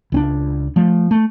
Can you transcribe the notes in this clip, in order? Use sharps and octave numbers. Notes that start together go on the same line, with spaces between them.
C#2 C4 D4
F3 A3
A3